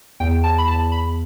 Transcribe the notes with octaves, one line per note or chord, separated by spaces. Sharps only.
E2 G5
A5
B5
E2 A5
B5